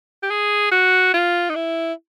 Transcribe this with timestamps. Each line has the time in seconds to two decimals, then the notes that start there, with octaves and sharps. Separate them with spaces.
0.23 G4
0.30 G#4
0.72 F#4
1.14 F4
1.50 D#4
1.55 E4